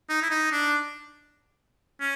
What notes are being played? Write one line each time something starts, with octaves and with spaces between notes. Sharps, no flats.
D#4
E4
D#4
D4
C#4